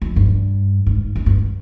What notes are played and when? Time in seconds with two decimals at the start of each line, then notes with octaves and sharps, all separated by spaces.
0.02 F2
0.16 G2
0.87 G#2
1.16 G#2
1.26 G2